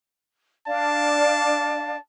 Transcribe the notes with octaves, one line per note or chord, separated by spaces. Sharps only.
D4 D5 F5 A5